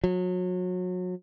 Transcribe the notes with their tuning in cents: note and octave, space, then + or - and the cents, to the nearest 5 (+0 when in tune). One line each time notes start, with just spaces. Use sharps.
F#3 -30